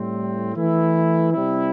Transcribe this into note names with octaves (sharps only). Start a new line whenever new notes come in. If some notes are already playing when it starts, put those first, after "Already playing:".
Already playing: A2 G3 C4
E3 A3 E4
C3 G3 C4 E4